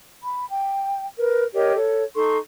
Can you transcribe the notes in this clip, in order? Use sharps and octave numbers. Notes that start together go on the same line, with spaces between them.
B5
G5
A#4 B4
G4 A#4 C#5 D#5
A4 C#5
D#4 A4 C6 C#6